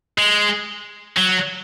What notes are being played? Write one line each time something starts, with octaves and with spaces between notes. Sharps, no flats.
G#3
F#3